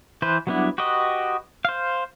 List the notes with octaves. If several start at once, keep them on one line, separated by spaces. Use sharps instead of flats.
E3 B4 C5
F#3 G3 B3 D4 E4
F#4 G4 B4 D#5
C5 F5